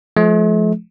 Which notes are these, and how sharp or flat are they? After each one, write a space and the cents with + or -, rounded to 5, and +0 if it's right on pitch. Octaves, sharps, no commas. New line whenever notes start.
F3 +0 A3 -45